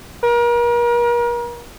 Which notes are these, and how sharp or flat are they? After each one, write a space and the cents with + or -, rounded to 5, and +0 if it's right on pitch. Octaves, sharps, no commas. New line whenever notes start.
A#4 +40